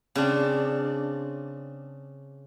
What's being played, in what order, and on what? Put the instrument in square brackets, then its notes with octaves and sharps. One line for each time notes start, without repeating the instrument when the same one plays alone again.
[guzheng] C#3 C4 D4